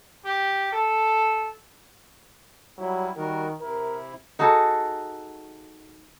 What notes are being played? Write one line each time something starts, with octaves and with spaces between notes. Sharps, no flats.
G4
A4
F#3 G3 E4
D#3 G3 F#4 A#4
C3 E4 A#4
D#4 F#4 G#4 A4